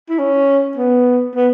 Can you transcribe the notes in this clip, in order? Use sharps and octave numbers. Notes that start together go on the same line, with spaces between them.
E4
C#4
B3
B3